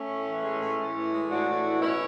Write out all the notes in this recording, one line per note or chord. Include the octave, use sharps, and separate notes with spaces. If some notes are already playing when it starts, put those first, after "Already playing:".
Already playing: A3 C#4
A2
E3
G#3
A2
A2
E3
G#3
A2 D4 F#4
A2
E3
B2 C#4 E4